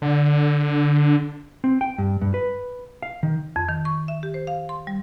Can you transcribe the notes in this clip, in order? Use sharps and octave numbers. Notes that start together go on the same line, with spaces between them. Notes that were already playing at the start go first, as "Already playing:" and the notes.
D3
C4
G5
G2
G2
B4
F5
D#3
F2
D#3
C#6
E5
G4
C5
F5
C6
G3